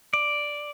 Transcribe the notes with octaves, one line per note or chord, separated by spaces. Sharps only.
D5